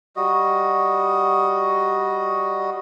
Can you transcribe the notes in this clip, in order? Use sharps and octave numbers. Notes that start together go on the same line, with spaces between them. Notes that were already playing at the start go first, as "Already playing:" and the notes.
G3 F#4 D#5